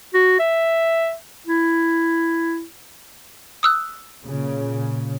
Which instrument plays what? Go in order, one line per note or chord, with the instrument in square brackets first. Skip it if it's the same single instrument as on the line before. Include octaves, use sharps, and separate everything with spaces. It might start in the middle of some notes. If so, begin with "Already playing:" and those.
[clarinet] F#4
E5
E4
[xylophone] D#6 E6 F#6
[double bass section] A#2 C#3